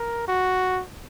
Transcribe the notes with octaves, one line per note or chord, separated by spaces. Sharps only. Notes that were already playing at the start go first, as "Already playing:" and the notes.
Already playing: A#4
F#4